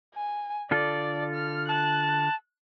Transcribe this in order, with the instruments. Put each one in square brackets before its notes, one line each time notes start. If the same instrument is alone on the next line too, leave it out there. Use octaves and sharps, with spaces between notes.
[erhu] G#5
[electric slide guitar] D3 F4 A4 [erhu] D5
[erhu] F6
[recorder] A5 [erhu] F#6